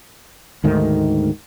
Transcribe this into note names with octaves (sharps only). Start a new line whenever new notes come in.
D2 G#2 D#3 A3